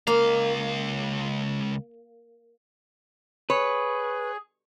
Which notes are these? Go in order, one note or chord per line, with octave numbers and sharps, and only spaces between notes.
C#2 A#3 F5
G#4 B4 C#5